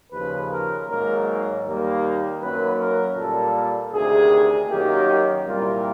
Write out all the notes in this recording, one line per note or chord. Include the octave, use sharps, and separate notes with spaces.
D#2 C#3 F3 B4
A#4
G#2 D#3 F#3 A#3 A#4
D#2 D#3 G3 A#3
F#2 D#3 F#3 A#3 B4
A#4
A#2 G3 A#3 A4
D2 C3 D#3 G#4
F#2 D#3 F#3 A#3 G4
C2 A#2 G3 A#3 F4